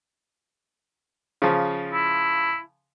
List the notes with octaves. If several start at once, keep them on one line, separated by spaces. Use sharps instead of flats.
C#3 F3
E4